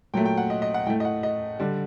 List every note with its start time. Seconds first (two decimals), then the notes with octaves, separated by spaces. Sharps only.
0.14 A#2 F#3 A3 G5
0.25 G5
0.37 F#5
0.50 D#5
0.62 D#5
0.74 F#5
0.87 A2 G5
0.90 A3
1.00 D#5
1.05 F#5
1.23 D#5
1.59 D3 G3 D5